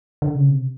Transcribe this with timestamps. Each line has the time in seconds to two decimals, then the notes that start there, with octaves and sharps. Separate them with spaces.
0.22 D3
0.35 C#3
0.49 C3